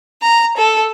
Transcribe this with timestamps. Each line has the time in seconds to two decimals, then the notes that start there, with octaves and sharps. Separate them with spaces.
0.21 A#5
0.55 A4